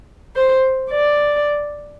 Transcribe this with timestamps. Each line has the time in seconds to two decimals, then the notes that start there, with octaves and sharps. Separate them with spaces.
0.36 C5
0.91 D5